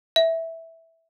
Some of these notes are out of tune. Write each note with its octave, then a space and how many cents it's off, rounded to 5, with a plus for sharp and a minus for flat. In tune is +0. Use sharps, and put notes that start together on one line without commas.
E5 -5